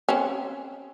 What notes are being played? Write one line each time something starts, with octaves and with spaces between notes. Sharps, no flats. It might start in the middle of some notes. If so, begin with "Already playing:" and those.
C4 C#4